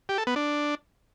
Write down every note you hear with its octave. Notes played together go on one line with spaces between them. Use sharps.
G4
A4
B3
D4